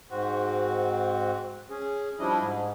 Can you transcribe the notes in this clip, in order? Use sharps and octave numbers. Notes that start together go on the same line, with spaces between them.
G#2 C4 F#4
C#4 G#4
F3 G3 D4 E4 D#5
G#2